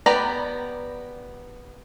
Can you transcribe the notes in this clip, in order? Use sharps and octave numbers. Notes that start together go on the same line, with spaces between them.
B3 G4 B4 D5 A#5